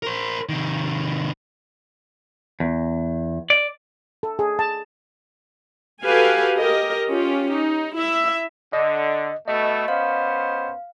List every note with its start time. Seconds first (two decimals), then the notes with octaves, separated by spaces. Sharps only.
0.03 A#4 C5
0.49 C3 D#3
2.60 E2
3.50 D5
4.23 A4
4.39 G#4
4.59 A5
6.04 F#4 G4 A4 B4 F5 G#5
6.57 G4 A#4 D#5
7.08 C#4 F4 G4
7.51 D#4
7.96 E4 E5
8.73 D3 D#5
9.48 B2 A3 D#5
9.88 B3 C#4 C5 F5